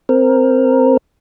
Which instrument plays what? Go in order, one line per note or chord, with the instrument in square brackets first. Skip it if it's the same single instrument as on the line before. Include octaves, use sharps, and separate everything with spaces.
[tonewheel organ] C4 A#4